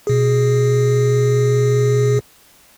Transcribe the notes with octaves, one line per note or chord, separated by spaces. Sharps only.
B2 G#4